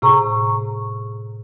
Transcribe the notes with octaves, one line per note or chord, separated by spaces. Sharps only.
A2 C3 G#4 A#5 C#6